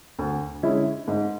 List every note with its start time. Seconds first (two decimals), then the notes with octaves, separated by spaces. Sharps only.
0.19 D2
0.63 D3 G#3 C#4 E4
1.08 G#2